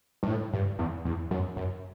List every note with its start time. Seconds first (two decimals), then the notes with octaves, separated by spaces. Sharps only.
0.23 G2
0.27 A2
0.53 G2
0.79 E2
1.05 E2
1.31 F#2
1.56 F#2